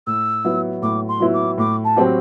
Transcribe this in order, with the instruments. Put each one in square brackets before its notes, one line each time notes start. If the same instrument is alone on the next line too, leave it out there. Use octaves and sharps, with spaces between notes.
[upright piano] A2 [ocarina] E6
[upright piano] F#3 B3 E4
[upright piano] A2 [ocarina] D6
[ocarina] C6
[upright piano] F#3 B3 E4
[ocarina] D6
[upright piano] A2 [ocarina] D6
[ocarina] A5
[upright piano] F#3 C4 G4